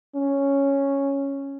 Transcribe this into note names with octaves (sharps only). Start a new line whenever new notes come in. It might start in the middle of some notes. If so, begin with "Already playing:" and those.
C#4